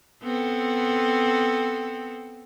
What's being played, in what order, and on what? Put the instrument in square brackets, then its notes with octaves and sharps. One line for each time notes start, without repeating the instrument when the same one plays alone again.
[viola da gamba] B3 C4 A4